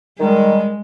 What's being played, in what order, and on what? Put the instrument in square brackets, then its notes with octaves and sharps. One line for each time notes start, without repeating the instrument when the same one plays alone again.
[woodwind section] D#3 G3 [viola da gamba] G#3